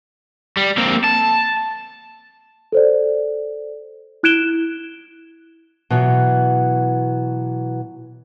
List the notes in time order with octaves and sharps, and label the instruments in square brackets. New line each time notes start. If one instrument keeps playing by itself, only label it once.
[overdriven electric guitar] G3
A#3 C4
A5
[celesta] A4 C5 D5
E4 F#6 G#6 D7 E7 G7
[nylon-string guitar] B2 E3 F#3